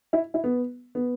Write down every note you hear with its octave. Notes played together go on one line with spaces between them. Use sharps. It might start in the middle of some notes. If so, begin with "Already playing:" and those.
E4
E4
B3
B3